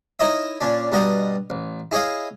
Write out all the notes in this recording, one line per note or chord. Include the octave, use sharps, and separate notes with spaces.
D#4 E4 A#4 C#5 D#5 E5
A#2 C#4 D4
G2 B2 G3 A#4 D#5 F#5
A1
E4 G#4 C#5 D#5 F5